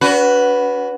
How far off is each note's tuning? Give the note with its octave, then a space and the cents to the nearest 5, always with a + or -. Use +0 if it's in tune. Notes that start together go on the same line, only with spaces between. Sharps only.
C#4 +45 F#4 +0 B4 +0